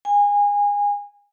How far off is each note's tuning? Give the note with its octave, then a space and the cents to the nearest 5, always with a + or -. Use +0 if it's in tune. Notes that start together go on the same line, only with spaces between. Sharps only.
G#5 -25